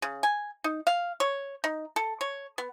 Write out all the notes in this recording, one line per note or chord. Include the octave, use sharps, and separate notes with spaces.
C#3
G#5
D#4
F5
C#5
D#4
A4
C#5
B3